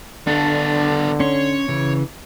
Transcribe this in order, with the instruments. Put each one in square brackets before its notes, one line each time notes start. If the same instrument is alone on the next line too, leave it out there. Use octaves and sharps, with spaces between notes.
[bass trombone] D3 [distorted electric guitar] B3 A4 [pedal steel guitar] D4
[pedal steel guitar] C#4 C6 [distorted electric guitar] C#5
[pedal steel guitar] C#3 E3